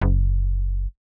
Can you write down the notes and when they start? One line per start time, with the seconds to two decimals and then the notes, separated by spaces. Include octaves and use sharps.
0.01 F#1